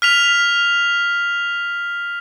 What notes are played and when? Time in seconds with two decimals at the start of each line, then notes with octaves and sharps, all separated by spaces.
0.02 F6 B6 F7